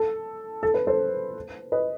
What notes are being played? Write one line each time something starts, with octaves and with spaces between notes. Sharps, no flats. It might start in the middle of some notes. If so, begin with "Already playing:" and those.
Already playing: A4
A4
B4
A4 C5
B4 D#5